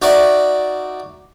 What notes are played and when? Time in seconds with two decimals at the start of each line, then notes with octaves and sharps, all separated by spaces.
0.02 D#4 F#4 D5 E5